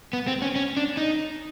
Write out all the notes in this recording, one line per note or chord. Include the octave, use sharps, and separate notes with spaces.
B3
C4
C#4
C#4
D4
D#4